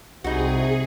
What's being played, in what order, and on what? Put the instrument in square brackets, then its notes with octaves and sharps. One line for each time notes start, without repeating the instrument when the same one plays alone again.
[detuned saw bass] C2 [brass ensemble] C3 [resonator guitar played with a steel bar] D#4 F#4 [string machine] G#4